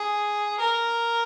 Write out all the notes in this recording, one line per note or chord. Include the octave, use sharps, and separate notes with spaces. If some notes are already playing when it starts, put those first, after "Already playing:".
Already playing: G#4
A#4